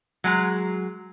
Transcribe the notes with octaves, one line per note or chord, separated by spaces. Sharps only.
F#3 G#3 A#5